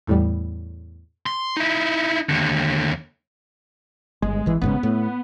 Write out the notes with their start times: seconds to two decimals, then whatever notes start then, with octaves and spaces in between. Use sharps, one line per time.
0.07 E2 A2 G3
1.26 C6
1.57 D#4 E4
2.29 D#2 D3
4.22 G1 G#3
4.46 G#1 E3
4.61 G1 G#2 C#3 B3
4.83 A2